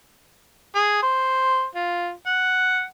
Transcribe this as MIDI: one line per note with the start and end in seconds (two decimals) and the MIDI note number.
0.75 1.02 68
1.03 1.65 72
1.75 2.10 65
2.26 2.84 78